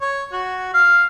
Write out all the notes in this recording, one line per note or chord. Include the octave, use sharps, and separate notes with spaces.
C#5
F#4
F5